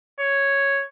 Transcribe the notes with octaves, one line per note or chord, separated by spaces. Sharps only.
C#5